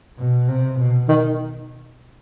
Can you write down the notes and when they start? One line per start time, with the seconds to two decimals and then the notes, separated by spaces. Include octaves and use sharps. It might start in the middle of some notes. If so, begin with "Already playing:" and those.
0.18 B2
0.48 C3
0.79 B2
1.08 D#3